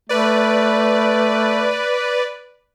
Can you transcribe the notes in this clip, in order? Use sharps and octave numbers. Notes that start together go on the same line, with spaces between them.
A3 B4 D5